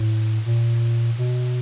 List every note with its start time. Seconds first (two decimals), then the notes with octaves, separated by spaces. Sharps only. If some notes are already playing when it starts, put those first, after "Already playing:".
Already playing: A2
0.46 A#2
1.18 B2